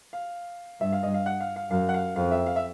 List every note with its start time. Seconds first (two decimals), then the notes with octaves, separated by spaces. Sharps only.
0.13 F5
0.80 G2 E5
0.92 F5
1.03 D#5
1.14 F5
1.26 F#5
1.40 F5
1.56 F5
1.71 F#2 F5
1.89 F#5
1.94 F5
2.16 F2 F5
2.31 E5
2.46 F5
2.56 E5